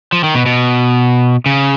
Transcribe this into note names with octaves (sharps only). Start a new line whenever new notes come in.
F3
D#3
B2
B2
C#3